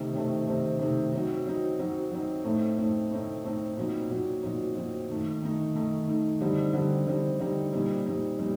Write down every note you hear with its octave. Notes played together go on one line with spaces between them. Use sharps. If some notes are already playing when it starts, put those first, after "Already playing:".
Already playing: C3 D#3 A3 C4 D#4
C3 D#3 A3 C4 D#4
C3 D#3 A3 C4 D#4
C3 D#3 A3 C4 D#4
F#3 C4 D#4
F#3 C4 D#4
F#3 C4 D#4
F#3 C4 D#4
A2 A3 C4 D#4
A2 A3 C4 D#4
A2 A3 C4 D#4
A2 A3 C4 D#4
A#2 F#3 C4 D#4
A#2 F#3 C4 D#4
A#2 F#3 C4 D#4
A#2 F#3 C4 D#4
D#3 A3 D#4
D#3 A3 D#4
D#3 A3 D#4
D#3 A3 D#4
D3 G3 C4 D#4
D3 G3 C4 D#4
D3 G3 C4 D#4
D3 G3 C4 D#4
A#2 G3 C4 D#4
A#2 G3 C4 D#4
A#2 G3 C4 D#4